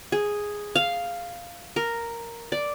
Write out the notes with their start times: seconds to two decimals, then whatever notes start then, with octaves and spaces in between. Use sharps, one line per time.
0.12 G#4
0.76 F5
1.76 A#4
2.52 D5